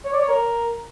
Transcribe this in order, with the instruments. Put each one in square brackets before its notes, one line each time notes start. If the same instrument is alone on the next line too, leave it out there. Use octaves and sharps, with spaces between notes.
[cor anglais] C#5
D5
C#5
A#4